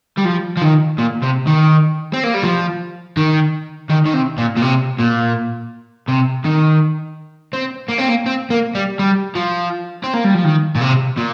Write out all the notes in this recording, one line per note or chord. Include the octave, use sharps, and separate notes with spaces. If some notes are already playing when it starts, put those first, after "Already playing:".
G3
F3
F3
D#3
A#2
C3
D#3
C4
A#3
G3
F3
D#3
D#3
D#3
C3
A#2
A#2
C3
A#2
C3
D#3
C4
A#3
C4
A#3
C4
A#3
G3
G3
F3
C4
A#3
G3
F3
D#3
A#2
C3
A#2